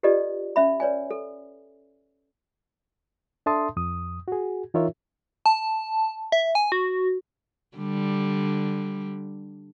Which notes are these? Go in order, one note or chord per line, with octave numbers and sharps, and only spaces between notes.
F4 G4 A4 B4 D5 D#5
C#4 E5 B5
B4 C#5 D5 G#5
A4
D4 A4 E5 A5 C6 D#6
F2 D#6
F#4 G#4
E3 D#4 F4 A#4 C#5 E5
A5
E5
G#5
F#4
D3 G3